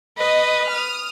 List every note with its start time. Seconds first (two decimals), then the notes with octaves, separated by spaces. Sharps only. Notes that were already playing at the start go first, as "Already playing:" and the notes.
0.18 B4 D#5
0.70 D#6 F6